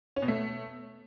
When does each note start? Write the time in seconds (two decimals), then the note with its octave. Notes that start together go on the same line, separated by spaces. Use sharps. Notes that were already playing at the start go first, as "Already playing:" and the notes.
0.16 C#4
0.22 B2
0.28 A3